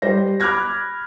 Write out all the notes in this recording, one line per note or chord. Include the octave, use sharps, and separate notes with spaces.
G3 C5 A#6
B5 D6 F6 F#6 G#6 A#6